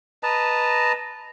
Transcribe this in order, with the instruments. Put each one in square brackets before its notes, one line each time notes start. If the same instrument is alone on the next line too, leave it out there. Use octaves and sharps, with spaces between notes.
[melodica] B4 D#5 A5 A#5